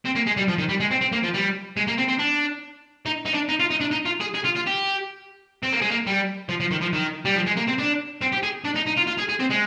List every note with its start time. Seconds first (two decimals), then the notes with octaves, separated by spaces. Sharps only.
0.05 C4
0.15 A#3
0.26 G#3
0.37 G3
0.48 F3
0.58 D#3
0.69 G3
0.80 G#3
0.91 C4
1.01 C4
1.12 A#3
1.23 F3
1.34 G3
1.77 G#3
1.88 A#3
1.98 C4
2.09 C4
2.19 D4
3.06 D#4
3.25 D#4
3.34 D4
3.49 D#4
3.60 F4
3.70 D#4
3.81 D4
3.91 D#4
4.06 F4
4.21 G#4
4.35 G#4
4.45 F4
4.56 F4
4.67 G4
5.63 C4
5.73 A#3
5.82 G#3
5.91 A#3
6.07 G3
6.49 F3
6.60 F3
6.71 D#3
6.81 F3
6.93 D#3
7.25 G3
7.36 F3
7.46 G#3
7.57 A#3
7.67 C4
7.78 D4
8.21 C4
8.32 G4
8.43 G#4
8.65 D4
8.75 D#4
8.86 D#4
8.97 F4
9.07 F4
9.18 G#4
9.29 G#4
9.40 C4
9.50 G#3